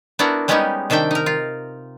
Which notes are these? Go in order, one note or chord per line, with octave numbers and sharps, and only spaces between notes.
B3 D4 E4 F#4 A#4
G3 G#3 B3 C#4 D#4 G4
C3 D#3 D4 E5 G5
D#4 A#4
F4